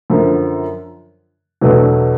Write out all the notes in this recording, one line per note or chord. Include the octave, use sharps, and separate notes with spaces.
F#2 D3 F3
E2 B2 F#3 A3 D4